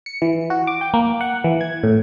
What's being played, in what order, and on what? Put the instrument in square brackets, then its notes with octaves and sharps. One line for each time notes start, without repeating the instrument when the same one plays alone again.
[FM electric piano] C#7
E3
F#4
D6
G5
A#3
F#5
E3
G#6
A2